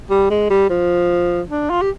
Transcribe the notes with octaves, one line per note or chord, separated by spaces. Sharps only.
G3
G#3
G3
F3
D4
F4
G4